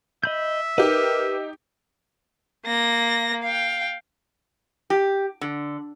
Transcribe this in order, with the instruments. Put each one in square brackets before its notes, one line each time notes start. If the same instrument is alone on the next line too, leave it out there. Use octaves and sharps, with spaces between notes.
[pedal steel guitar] D#5 B5 G6 [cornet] E5
[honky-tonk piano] D#4 G4 [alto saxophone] A#4 [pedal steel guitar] B4
[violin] A#3 A#6
F5 G5
[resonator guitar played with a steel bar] G4
D3